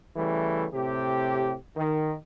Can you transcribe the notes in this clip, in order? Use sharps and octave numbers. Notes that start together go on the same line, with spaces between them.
C#3 E3 G3 A3
A2 C3 G4
D#3